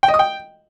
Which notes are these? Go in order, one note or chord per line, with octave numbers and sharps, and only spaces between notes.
G5
D#5
D#6
G5